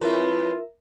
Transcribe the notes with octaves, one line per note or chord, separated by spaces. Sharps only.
F2 G#3 E4 F4 A#4 B4 E5